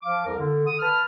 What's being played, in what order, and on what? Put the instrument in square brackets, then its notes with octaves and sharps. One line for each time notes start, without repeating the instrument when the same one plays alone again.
[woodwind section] F3 F5 D6
C2 F2 A#4
D3
D3 D#6
B4 A5 F6